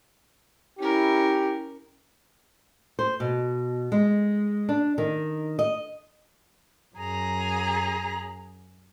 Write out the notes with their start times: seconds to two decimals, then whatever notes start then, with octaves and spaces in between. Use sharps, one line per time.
0.79 C#4 E4 G4 A#4
2.99 C5
3.20 B2
3.92 G#3
4.69 D4
4.98 D#3
5.59 D#5
6.96 F#2 G#4 A#5